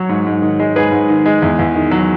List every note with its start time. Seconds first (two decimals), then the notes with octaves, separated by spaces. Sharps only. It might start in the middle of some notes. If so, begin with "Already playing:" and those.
Already playing: F#3 C#5
0.09 G#2
0.27 G#2
0.42 D#3
0.59 G#3
0.76 G#2 G#4 B4
0.92 G#2
1.09 D#3
1.26 G#3
1.42 E2
1.59 E2
1.75 D#3
1.91 F#3